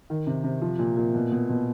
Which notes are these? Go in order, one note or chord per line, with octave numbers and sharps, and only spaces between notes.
D#3
C3
C3
F3
A#2
A#2
B2
B2
B2